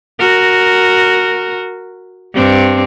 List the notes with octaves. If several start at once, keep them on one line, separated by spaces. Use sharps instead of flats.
F#4 A#4
G2 C4 D4